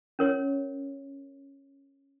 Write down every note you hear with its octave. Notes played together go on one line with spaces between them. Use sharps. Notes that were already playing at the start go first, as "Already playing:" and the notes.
C#4 A#4 C#5